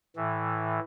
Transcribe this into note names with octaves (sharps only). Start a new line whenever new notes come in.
A2 E3